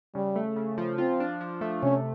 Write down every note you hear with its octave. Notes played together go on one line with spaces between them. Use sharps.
C#3 G3
A3
C#3
F3
C4 F4
D4
F3
A3
C3 C#4